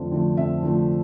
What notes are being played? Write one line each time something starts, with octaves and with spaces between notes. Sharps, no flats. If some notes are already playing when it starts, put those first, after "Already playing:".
Already playing: F2 D3 F3 A3
D3 F3 A3
F2 E5
D3 F3 A3